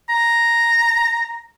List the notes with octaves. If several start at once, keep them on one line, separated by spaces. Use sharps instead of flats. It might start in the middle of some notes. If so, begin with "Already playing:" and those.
A#5